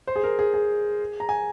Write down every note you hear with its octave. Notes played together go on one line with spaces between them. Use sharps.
C5
G#4
A#4
G#4
G#4
A#5
G#5